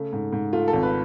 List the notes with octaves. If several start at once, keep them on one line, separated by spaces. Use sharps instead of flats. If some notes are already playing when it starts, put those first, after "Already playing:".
Already playing: C#3 A3
G#2
G#2
A3 F4
A4
G#1
B4